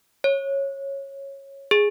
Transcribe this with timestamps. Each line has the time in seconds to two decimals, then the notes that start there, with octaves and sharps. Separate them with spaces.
0.24 C#5
1.71 G#4